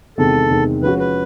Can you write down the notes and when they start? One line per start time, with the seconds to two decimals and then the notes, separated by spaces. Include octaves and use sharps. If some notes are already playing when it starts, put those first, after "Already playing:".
0.18 E2 C3 D#3 G#3 C4 A4
0.50 E2 C3 D#3 G#3 C4
0.83 F3 G#3 C#4 F#4 B4
1.00 B4